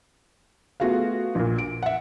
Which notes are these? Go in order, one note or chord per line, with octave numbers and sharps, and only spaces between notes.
A3 B3 F4 F#4 G#4 F5
A#1 A#2
D7
E5 F#5